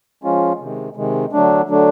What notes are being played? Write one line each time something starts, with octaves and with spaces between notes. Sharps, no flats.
F3 G#3 C#4 F4
C3 D#3 G#3
C3 D#3 G#3
D3 F#3 A3 D4
D3 F#3 A3 D4